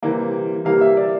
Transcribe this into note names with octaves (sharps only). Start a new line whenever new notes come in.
C3 E3 G3 A#3
C3 E3 G3 A#3 F5
E5
D5